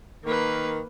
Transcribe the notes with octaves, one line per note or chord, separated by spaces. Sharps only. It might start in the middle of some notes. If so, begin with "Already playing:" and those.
D#3 A#3 B4